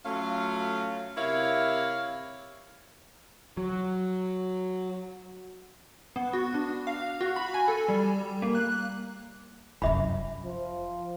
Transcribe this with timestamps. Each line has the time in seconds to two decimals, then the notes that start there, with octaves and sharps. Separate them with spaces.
0.05 F#3 A3 C#4 F4 F5
1.17 C3 E4 A#4 C#5 E5 F5
3.57 F#3
6.16 B3
6.33 F#4
6.54 D4
6.87 F5
7.21 F#4
7.36 B5
7.54 G#5
7.68 A4
7.89 G3
8.42 A#3
8.55 F#6
9.82 F1 F#2 E5 B5
10.45 F3